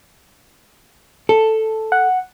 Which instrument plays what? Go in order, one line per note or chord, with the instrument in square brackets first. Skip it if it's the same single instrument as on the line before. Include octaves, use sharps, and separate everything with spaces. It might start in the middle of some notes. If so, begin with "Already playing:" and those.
[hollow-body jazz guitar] A4
[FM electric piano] F#5